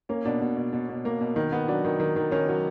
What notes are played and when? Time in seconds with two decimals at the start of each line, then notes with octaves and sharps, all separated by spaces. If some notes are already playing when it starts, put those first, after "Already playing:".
0.09 A#3 C#4
0.25 B2 D4
0.41 B2
0.57 B2
0.73 B2
0.89 B2
1.05 A#3
1.21 B2
1.36 D#3
1.52 B3
1.68 F#3 D4
1.85 D#3
2.00 D#3
2.16 D#3
2.32 D#3 C#4
2.48 F#3